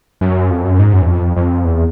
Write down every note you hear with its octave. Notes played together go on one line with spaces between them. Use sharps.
F#2
F2
F#2
G#2
F#2
E2
F2
F2
E2